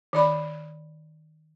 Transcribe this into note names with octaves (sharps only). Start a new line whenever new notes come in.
D#3 D5 B5